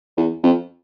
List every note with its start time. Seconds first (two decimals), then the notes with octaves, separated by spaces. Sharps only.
0.17 E2
0.43 F2